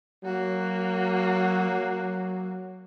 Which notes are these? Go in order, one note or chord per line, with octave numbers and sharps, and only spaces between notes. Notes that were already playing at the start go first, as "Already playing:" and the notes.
F#3 A#3 F#4
F#3